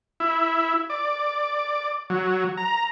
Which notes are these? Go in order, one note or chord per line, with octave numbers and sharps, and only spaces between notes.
E4
D5
F#3
A#5